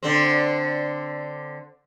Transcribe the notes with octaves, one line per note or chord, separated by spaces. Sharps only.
D3 C4